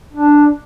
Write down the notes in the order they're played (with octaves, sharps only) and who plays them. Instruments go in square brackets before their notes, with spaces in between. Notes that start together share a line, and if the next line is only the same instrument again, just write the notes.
[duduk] D4